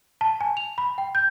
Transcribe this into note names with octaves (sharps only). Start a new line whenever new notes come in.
A5
G#5
F7
B5
G5
G6